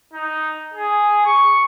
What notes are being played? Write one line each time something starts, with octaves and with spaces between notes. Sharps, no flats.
D#4
G#4
C#6